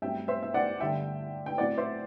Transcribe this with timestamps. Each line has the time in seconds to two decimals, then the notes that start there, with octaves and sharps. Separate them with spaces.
0.02 G2 F#3 A3 C4 E5 G5
0.28 C5 E5
0.43 E5
0.54 D5 F#5
0.80 G2 D3 A3 D4 E5 G5
1.46 G5
1.58 A2 F#3 C4 D5 F#5
1.77 C5 E5